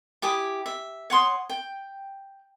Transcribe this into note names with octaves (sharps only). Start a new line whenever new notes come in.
E4 G4 G#5 D#6
E5
C#5 F#5 C6 D#6
G5